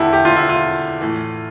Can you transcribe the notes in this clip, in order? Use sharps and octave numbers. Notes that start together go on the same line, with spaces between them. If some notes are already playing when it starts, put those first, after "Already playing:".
Already playing: E2 D3 E4 G4 A4
G4
F4
E4
F4
A2 E3